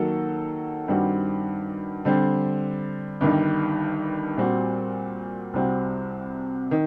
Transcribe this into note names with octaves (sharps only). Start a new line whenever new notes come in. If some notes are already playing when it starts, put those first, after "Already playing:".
Already playing: D#3 F#3 A#3 F#4 A4
G2 D#3 G3 C4 F#4
D3 G3 C4
G1 G2 D#3 G3
A#2 G3 C4 F#4
C2 C3 G3 C4 F#4
D#3